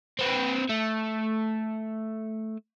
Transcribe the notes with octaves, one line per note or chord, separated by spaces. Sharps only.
C4 B4
A3